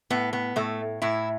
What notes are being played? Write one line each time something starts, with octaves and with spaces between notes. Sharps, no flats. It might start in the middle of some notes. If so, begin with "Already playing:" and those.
A2 B3
B3
A2 A3
A2 E4